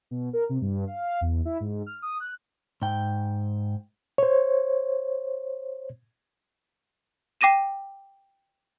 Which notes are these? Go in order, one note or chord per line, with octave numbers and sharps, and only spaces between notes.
B2
A#4
C3
G2
F5
E2
E4
G#2
F6
D#6
F#6
G#2 G5
C5 C#5
G5 D6 A#6 D#7 E7